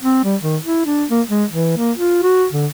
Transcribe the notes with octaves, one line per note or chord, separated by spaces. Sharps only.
C4
G3
D#3
E4
D4
A#3
G#3
E3
A#3
F4
F#4
D3